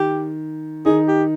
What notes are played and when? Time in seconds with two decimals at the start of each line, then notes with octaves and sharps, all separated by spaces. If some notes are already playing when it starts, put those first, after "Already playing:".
Already playing: D#3 G4
0.86 D#3 D#4 G#4
1.08 G4